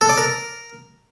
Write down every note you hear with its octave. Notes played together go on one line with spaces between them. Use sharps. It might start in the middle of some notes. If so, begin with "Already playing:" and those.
A4
D5
A#4